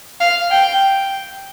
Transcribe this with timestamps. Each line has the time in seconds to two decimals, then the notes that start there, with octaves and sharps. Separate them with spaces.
0.20 F5
0.51 G5